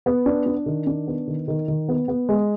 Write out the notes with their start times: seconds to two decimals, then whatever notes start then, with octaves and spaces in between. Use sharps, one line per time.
0.06 B3
0.26 D4
0.46 D4
0.66 D#3
0.87 D4
1.07 B3
1.27 D#3
1.48 D#3
1.68 D#3
1.88 B3
2.08 B3
2.29 G#3